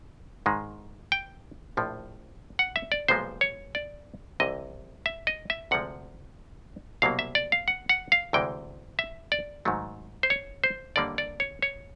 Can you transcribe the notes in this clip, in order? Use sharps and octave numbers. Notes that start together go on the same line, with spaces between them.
G#2 D#3 G#3
G5
A#1 A2 F3
F#5
E5
D5
B1 A#2 F3 G#3 B3 C5
C#5
D5
C2 C3 E3 D#5
E5
D#5
E5
D2 C3 F3 G#3 F#5
C2 B2 F#3 A#3 F5
E5
D5
F5
F#5
F#5
F5
D2 C3 E3 G#3 G5
E5
D5
G#2 D#3 F#3 A3
C5
C#5
C5
D#2 D3 G3 A#3 D5
D5
C#5
C#5